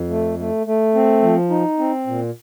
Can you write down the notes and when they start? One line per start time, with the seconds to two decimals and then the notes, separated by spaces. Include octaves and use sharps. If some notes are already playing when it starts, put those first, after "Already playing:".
Already playing: F2
0.10 A3
0.39 A3
0.67 A3
0.95 C4
1.22 F3
1.50 D#4
1.79 C4
2.07 A#2